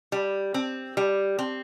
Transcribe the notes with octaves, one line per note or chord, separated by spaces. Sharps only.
G3
C4
G3
C4